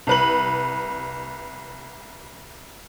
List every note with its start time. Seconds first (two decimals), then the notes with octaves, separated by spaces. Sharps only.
0.07 C2 B4 F#7